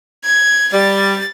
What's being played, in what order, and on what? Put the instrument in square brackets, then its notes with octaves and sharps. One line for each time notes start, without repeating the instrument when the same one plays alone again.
[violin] G#6
[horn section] G3 [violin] A6